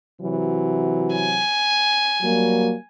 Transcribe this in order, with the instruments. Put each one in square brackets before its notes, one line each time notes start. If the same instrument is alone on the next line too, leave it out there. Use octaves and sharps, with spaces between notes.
[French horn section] C3 E3 F#3
[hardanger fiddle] G#5
[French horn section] F#3 G3 A#3